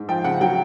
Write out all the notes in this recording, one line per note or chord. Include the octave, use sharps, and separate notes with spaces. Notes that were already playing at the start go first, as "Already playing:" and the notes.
Already playing: G#2
F3 G5
C#3 F#5
F#3 G5